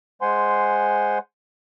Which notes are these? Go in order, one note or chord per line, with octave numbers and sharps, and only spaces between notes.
G#3 C5 F#5 G#5 C6